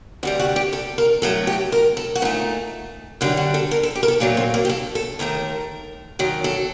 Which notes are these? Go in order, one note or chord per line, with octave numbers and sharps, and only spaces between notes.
D2 C3 G3 F#4
F#4
G4
A4
A#4
A2 F#3 A3 A4
G4
A#4
A4
F#4
A#2 A3 D#4
F#2 D3 G3 D#4
F#4
A4
A#4
A4
G4
A#4
A4
A#2 F#3 A3 D4
C4
A#3
G4
A4
A4
D#2 D#3 A3 A#4
F#2 D#3 F#3
A4